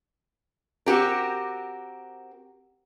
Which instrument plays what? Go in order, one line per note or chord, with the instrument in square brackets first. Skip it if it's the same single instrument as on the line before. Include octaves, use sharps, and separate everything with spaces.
[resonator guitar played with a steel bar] C4 F#4 G4 A#4